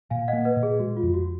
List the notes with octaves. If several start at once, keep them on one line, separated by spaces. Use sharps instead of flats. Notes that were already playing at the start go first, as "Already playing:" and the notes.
A#2 F5 G#5
D#5 F#5
A#3
B4 D#5
A#2
G#4
G#3 F#4
F4
F2
F#4